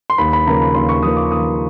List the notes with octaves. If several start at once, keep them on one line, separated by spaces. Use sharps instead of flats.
C6
D#2 B5
B5
C#3 F3 A#3 A#5
B5
D#2 C6
C#6
C#3 F3 A#3 D#6
D6
D#2 D#6